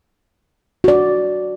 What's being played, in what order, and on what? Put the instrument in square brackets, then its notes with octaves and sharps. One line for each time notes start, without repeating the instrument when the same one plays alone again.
[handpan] F#4 D5